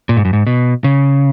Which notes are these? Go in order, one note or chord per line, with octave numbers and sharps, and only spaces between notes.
A#2
G#2
F#2
G#2
B2
C#3